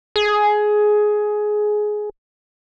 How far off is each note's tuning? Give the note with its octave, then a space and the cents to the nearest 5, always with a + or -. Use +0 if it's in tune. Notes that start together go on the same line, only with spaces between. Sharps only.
G#4 +15